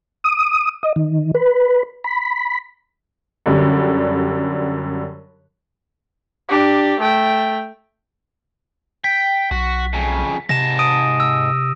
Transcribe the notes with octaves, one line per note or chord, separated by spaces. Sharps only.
D#6
D#5
D#3
B4
B5
F#2 D3 G3
D4 G4
A3 G5
G5 B6
B1 F#4
F2 C#3
G#2 C3 A5 A#6 E7
D#6 D7 D#7
E6